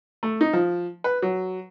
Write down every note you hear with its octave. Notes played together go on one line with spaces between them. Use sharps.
A3
D#4
F3
B4
F#3